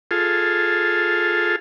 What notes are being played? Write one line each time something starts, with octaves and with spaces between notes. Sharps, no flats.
F4 G#4 A4